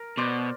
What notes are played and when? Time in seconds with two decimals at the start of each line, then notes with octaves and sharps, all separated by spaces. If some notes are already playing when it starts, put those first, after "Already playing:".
Already playing: A#4
0.17 B2 C5 D5